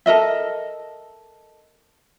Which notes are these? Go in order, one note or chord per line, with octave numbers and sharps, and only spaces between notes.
A4 A#4 D#5 E5